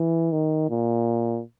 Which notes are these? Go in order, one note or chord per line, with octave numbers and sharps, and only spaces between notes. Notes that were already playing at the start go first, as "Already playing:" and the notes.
Already playing: E3
D#3
A#2